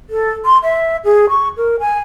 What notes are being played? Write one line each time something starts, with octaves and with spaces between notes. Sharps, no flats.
A4
C6
E5
G#4
C#6
A#4
G#5